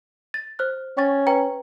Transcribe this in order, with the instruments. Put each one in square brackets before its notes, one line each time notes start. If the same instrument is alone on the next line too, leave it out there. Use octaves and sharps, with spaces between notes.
[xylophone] A6
C5 F6 F#6
[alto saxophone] C#4 [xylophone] G5 C#6 A6
[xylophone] B4 G5 A#5